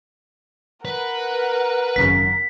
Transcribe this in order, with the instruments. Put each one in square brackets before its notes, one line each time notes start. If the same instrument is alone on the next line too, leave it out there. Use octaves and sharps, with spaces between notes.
[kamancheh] A#4 F#5 [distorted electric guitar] B4
[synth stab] G#1 F#2 C#3 [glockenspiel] B6